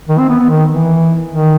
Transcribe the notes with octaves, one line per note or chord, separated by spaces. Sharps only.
D#3
C4
B3
B3
D#3
E3
D#3